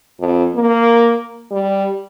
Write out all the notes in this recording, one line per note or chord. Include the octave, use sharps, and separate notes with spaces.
F2
A#3
G3